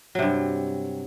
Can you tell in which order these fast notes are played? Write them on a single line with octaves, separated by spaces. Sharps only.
F#3 C3 G2